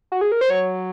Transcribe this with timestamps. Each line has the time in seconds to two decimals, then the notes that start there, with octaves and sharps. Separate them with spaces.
0.12 F#4
0.21 G#4
0.32 A#4
0.41 C5
0.50 F#3 C#5